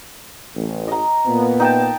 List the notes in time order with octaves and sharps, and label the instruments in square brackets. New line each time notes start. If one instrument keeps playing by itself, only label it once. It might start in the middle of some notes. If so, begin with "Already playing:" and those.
[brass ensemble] A1
[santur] D#5 A#5
[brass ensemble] A#2 A#3 B3
[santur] D#4 G5 A5